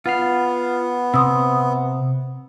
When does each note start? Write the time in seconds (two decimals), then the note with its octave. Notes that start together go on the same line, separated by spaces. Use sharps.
0.06 B3 F4 F5
1.14 C3 C6 D#6 E6